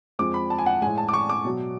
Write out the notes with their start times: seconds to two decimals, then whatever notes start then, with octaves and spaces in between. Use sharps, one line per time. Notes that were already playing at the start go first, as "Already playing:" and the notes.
0.19 F2 F3 G#3 D6
0.34 B5
0.50 A5
0.58 G#5
0.66 F#5
0.82 A2 G#3 G#5
0.98 A5
1.09 D6
1.14 C#6
1.30 D6
1.45 B2 F#3